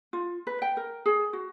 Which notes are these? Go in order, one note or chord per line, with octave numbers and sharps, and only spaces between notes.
F4
B4
G5
A#4
G#4
F#4